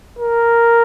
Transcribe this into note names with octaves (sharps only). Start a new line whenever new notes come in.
A#4